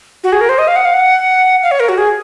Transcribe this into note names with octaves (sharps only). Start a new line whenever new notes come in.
F#4
G#4
A#4
C5
D#5
F5
F#5
F5
F#5
F5
C#5
A#4
F#4
G#4